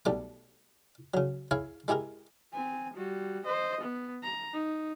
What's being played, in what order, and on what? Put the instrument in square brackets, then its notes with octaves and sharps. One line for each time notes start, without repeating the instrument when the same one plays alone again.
[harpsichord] B1 G3 A3 D6
C#3 F#3
E4 G#4 C#5 F5
G#3 E4 G4 G#4 A#4
[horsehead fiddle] C4 G#5
G3 F#4
C5 D#5
B3
A#5
D#4